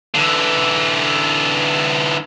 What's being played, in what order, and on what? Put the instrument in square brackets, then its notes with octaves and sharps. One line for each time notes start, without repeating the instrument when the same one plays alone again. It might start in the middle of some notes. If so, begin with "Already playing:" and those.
[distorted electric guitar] D3 E3